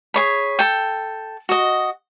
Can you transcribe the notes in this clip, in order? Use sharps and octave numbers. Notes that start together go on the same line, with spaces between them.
G#4 C#5 B5
A4 G5
F#4 D#5